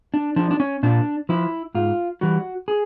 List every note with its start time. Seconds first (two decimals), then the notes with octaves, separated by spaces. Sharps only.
0.14 D4
0.36 F3 D4
0.51 D4
0.60 C#4
0.83 A#2 D4
1.29 F3 E4
1.74 G#2 F4
2.21 E3 G3 F#4
2.68 G#4